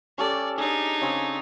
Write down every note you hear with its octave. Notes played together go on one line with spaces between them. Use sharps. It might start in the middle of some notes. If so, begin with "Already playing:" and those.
C#4 G4 A4 D5
D4 D#4 G#4
C#3 C4 G#4